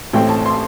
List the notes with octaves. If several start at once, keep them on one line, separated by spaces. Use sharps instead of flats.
A1 A2 A3 C4 G5
A5
C6